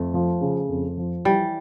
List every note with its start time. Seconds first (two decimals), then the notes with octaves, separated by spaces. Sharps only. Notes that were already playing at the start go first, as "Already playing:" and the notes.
Already playing: F2 A3
0.14 F3
0.41 C#3
0.69 F2
0.97 F3
1.25 E3 G3